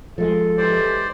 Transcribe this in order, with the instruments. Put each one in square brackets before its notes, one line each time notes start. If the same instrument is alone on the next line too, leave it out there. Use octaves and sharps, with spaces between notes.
[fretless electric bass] F3 G#3 [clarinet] A4
[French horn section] G#2 E3 G4 [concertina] C5 D5